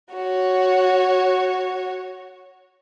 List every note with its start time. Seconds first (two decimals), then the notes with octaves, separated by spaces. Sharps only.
0.12 F#4 C#5